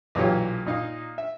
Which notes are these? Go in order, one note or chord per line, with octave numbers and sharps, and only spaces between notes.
B1 A#2 E3 F4 G4 C#5
A#2 D#4 F5
E5